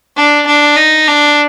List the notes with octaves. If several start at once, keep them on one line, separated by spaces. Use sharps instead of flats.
D4
D4
D#4
D4